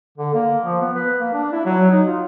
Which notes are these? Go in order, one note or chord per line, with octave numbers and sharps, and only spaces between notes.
D3
A#3
F3
B3
B4
A#3
D4
E4
F#3
D#4
F4